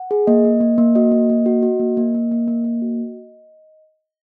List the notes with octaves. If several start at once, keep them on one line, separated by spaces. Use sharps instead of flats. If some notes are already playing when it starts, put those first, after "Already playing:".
Already playing: F#5
G#4
A#3 D#5
A#3
A#3
A#3
F#4 D#5
A#3
A#3
F#4
F#4
A#3
A#3
A#3
A#3
A#3
A#3
F#4